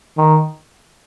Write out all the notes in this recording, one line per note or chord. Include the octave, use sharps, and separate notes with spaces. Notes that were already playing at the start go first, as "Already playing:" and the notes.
D#3